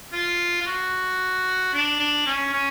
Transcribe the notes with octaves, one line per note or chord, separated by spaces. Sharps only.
F4
F4
F#4
D4
D4
C#4
C#4